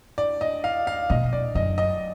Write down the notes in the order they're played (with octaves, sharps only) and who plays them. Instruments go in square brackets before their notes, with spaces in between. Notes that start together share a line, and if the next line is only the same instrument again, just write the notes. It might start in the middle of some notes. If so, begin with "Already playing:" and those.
[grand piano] D5
D#5
F5
F5
[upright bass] B2 [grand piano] D#5
[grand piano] D5
[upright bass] F#2 [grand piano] D#5
[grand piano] D#5